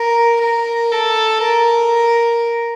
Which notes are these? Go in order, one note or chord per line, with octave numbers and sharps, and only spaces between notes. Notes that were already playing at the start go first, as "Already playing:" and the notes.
Already playing: A#4
A#4
A4
A#4